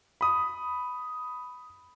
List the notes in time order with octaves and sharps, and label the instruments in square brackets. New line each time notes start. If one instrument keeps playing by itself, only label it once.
[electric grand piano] B5 D#6